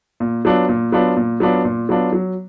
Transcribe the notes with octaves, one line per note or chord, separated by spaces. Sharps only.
A#2
F#3 B3 D4 F4
A#2
F#3 B3 D4 F4
A#2
F#3 B3 D4 F4
A#2
F#3 B3 D4 F4
F#3